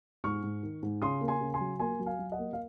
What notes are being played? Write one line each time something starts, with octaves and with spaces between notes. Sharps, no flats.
G#2 C#6 F6
G#2
D#3
G#2
C#3 C6 D#6
A#3
G#5 C6
C#3
G#5 C6
F#3
A#3 G#5 C6
F#3
F5 G#5
F#3
D#5 F#5
A#3
F5